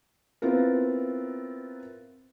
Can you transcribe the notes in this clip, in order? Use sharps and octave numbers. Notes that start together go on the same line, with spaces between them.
B3 C4 E4 F4 A#4